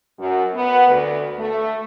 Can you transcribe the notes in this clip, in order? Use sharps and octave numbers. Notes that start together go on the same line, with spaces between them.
F#2
B3
D2
A3